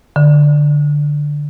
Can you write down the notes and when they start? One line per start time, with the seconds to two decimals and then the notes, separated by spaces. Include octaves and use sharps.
0.16 D3